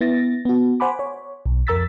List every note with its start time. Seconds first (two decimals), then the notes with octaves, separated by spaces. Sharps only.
0.01 B3 E4 A6 A#6
0.45 B3 F#4
0.80 C5 F#5 G#5 B5 D6
0.99 C#5
1.46 B1
1.67 F2 A#4 A#5 E6 A6 B6